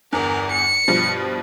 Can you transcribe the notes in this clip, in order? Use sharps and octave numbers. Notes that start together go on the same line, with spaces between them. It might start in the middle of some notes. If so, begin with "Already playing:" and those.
G1 E2 A#4
C#7
G2 B2 F3